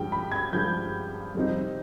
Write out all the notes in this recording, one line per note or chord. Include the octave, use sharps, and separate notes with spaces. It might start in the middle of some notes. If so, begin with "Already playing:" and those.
Already playing: G2 F3 G#3 G5
B5
G#6
G2 F3 G#3 G6
F2 C3 G3 C4 D#4